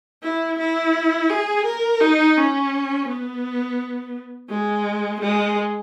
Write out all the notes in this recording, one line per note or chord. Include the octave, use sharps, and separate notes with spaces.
E4
E4
G#4
A#4
D#4
C#4
B3
G#3
G#3